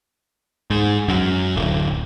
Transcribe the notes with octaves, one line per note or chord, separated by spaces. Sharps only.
G#2
F#2
D1